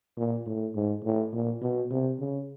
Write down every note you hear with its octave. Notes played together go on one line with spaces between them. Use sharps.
A#2
A2
G#2
A2
A#2
B2
C3
C#3